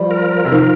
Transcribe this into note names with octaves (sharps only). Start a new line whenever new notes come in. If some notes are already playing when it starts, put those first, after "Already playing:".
Already playing: F3 G3
A#4
C3
D#3 F3